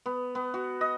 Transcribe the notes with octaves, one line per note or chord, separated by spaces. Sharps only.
B3
B3
F#4
D#5